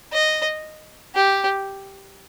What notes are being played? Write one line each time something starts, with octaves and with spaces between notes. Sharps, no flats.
D#5
G4